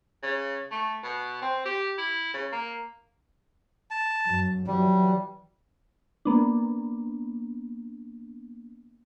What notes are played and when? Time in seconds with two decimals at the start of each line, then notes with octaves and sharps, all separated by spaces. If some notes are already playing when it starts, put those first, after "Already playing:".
0.23 C#3
0.71 A3
1.04 B2
1.41 C4
1.65 G4
1.98 E4
2.34 C#3
2.52 A#3
3.91 A5
4.27 F#2
4.67 E3 F#3 G3
6.25 A#3 B3 D4